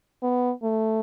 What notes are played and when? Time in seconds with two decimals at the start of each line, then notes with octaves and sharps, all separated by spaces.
0.23 B3
0.63 A3